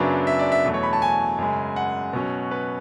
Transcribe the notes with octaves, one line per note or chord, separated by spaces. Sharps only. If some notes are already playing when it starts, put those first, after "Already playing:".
Already playing: F#2 C#3 F#3 B3 D4 E5
E5
D5
E5
E2 B2 F#3 A3
C#5
B5
A5
G#5
F#2 C#3 G#3
F#5
B2 F#3 C#4
B4